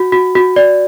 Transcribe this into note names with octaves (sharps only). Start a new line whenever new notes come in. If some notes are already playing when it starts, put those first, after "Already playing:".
Already playing: F#4
F#4
F#4
D5